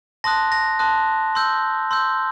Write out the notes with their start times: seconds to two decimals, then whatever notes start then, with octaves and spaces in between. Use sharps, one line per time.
0.24 A5 C6 D#6 F#6 A#6
0.52 A#6
0.79 A5 C6 D#6 F#6
1.35 C6 E6 G6
1.91 C6 E6 G6